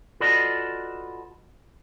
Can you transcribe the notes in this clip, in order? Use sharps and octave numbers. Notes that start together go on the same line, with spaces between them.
F4 F#4 A4 B4 D5 D#5